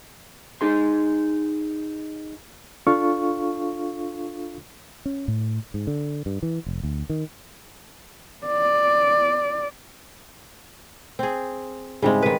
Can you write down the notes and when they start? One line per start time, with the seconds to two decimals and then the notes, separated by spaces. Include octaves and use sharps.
0.61 D#4 G#4 C6
2.87 D4 F4 A4 F5 C#6
5.06 C#4
5.28 A2
5.74 G#2
5.87 D3
6.26 G2
6.43 E3
6.66 F1
6.83 D2
7.10 D#3
8.46 D5
11.19 C4 G#4
12.02 G#2 C#3 G3 G#3 C4 E4
12.22 D#3 B4